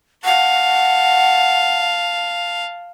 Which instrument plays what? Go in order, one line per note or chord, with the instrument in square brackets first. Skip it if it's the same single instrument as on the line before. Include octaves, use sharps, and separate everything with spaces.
[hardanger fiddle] F5 A5 [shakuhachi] F#5